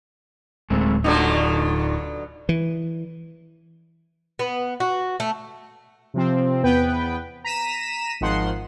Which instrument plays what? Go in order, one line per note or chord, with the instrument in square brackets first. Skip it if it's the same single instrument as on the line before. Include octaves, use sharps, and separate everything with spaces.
[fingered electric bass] D1 [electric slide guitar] G#3 A3 C4
[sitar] B2 D3 F#3 [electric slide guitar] D#4 F4 A4
[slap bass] E3
[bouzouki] B3
F#4
A3
[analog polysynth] C3 F3 C4
E2 B3 B4 G5
A#5 B6 D#7 E7
G#1 D#3 F3 F#5 C6